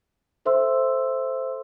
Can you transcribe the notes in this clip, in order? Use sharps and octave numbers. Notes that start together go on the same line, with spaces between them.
A4 C5 E5 C6 E6